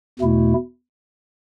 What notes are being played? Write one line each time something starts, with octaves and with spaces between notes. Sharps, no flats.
E2 B2 A3 E4